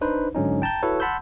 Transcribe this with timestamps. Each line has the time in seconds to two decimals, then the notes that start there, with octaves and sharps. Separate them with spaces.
0.01 D4 D#4 B4 C5
0.35 G#2 D3 F#3 C#4 D#4
0.62 G5 A5 A#5 G6
0.83 E4 F#4 A4 B4 C#5
1.00 F#5 A5 B5 C6 E6 G6